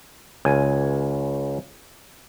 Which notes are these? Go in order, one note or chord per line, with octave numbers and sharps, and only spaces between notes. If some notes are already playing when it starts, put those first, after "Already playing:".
C#2 G#5